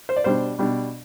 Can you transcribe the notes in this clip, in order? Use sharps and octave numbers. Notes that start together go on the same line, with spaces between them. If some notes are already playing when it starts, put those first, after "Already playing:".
C5
D5
B2 G3 D4 C5
B2 G3 D4